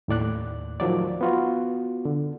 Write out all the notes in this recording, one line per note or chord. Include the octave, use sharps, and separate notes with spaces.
D#2 A2 D5 F#6
D#3 F3 F#3 D5
B3 F4 F#4
D3